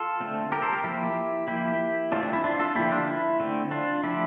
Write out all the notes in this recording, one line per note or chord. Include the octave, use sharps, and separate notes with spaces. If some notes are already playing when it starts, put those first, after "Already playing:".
Already playing: F4 A4
D3 A3 C4
G4 A#4
A4 C5
G4 A#4
F3 A#3 E4 G4
F3 A#3 E4 G4
E3 A3 C4 D4 F4
D4
E4
D4 F4
F4 A4
D3 F3 A#3 E4 G4
D4 F4
E4
D3 A3 C4
D4 F4
D3 F3 A3 E4 G4